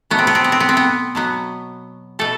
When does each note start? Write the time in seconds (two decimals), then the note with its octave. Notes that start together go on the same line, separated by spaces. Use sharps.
0.10 B2 F#3 A3 B3
0.19 C4
0.27 B3
0.35 C4
0.44 B3
0.52 C4
0.60 B3
0.69 C4
0.77 B3
1.15 B2 F#3 B3
2.19 B2 A3 A4